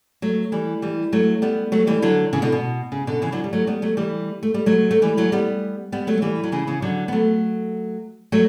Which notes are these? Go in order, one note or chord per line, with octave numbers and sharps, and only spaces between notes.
F#3 A3
E3 G3
E3 G3
F#3 A3
G3 B3
F#3 A3
E3 G3
D3 F#3
C#3 E3
B2 D3
B2
C#3
B2 D3
C#3 E3
D3 F#3
G3
F#3 A3
G3 B3
F#3 A3
E3 G3
A3
G3
F#3 A3
A3
E3 G3
F#3 A3
G3 B3
G3 B3
F#3 A3
A3
E3 G3
F#3
C#3 E3
C#3 E3
D3 F#3
B3
F#3 A3
F#3 A3